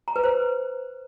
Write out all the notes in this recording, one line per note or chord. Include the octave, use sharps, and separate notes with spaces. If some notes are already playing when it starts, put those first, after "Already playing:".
A#5
B4
C5